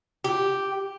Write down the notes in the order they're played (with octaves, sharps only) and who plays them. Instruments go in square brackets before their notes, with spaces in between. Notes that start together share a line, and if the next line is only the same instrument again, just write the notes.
[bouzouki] G4